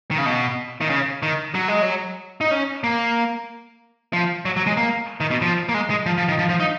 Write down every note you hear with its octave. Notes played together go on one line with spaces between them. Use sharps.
D#3
C#3
B2
D#3
C#3
D#3
F#3
G#3
F#3
D#4
C#4
A#3
F3
F#3
F#3
G#3
A#3
D#3
B2
F3
A#3
G#3
G#3
F3
F3
D#3
F3
F3
D#4